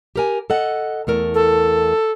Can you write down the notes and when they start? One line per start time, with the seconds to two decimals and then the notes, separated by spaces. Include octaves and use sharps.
0.16 G4 A#4 G#5
0.50 A4 D#5 F#5
1.07 E2 A3 A#4
1.35 A4